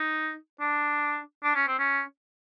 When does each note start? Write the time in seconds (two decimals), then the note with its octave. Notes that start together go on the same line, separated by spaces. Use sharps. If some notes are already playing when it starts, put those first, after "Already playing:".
Already playing: D#4
0.60 D4
1.44 D4
1.56 C#4
1.68 C4
1.79 C#4